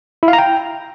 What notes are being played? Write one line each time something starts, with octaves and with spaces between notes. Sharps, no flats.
E4
F5
A#5
G5